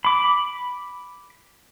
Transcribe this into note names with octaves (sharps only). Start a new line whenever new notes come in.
B5 D6